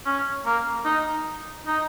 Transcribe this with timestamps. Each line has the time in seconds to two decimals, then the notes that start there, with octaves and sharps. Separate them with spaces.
0.05 C#4
0.46 A#3
0.85 D#4
1.67 D#4